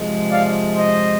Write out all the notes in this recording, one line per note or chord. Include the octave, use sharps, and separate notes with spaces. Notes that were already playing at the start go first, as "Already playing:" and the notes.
Already playing: C3 F3 G#3
D5 F5
C5 D#5